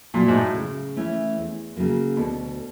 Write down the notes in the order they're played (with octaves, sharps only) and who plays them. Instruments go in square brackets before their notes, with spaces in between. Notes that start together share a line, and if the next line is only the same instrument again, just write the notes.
[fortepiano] A#2 [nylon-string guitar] F#3 A3
[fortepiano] G#2
A2
[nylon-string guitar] C#3
E3 A3 C#4
E2
C#3 F#3 A#3
[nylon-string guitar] D2 [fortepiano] B2